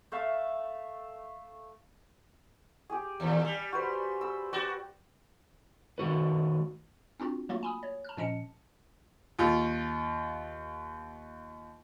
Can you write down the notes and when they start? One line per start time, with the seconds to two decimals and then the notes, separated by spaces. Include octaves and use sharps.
0.12 A3 E5 F5
2.90 G4 G#4
3.20 D#2 A#2
3.45 G3
3.72 F#4 B4 C5
4.21 E6
4.53 F#4 D5 G5
5.98 D#3 A3 F#4 B4
7.20 C4 D4 F4 F#4
7.49 F#3 A3 A#3 F4 F#4
7.63 G#5 B5 D#6
7.83 C#5
8.04 A5 F6
8.17 A#2 F3 C#4 D#5 A5 C#7
9.39 D#2 F4